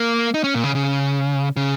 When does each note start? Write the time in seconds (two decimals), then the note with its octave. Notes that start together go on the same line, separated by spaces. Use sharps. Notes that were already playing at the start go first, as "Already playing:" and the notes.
Already playing: A#3
0.34 D#4
0.44 C#4
0.54 A#2
0.64 C#3
0.75 C#3
1.57 C#3